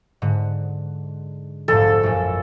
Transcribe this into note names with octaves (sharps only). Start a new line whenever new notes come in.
G#2 D3
F1 A#1 G#2 A4
F#2 A#2